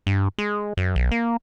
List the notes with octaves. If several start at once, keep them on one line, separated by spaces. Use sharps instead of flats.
G2
G#3
F#2
B1
A#3